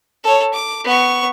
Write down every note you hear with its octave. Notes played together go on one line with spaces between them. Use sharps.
A4 C#5
D6
B3 C#6